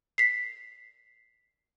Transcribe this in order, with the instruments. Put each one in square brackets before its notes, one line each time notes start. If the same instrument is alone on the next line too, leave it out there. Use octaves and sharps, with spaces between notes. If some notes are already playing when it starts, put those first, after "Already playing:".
[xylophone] B6 C7